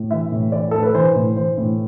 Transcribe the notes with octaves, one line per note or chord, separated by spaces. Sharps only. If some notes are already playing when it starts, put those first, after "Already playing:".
Already playing: A2
E3 E5
A2
E3 D5
A2 A4
B4
E3 C5
A2
E3 C5
A2